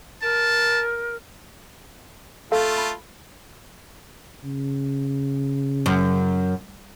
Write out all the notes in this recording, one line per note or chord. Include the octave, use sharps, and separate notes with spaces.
A#4 A5
A3 F4 A4 F5 A5
B5
C#3
F#2